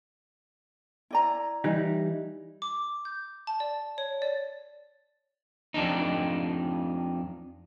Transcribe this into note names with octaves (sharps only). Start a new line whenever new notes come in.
E4 D5 A#5
E3 G3 D#4
D6
G6
A5
D5
C#5
D5
F2 D4 D#4